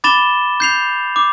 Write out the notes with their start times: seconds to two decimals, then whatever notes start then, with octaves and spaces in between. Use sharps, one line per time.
0.04 B5 D6 A6 E7 G7
0.60 G6 C7 F7
1.16 D6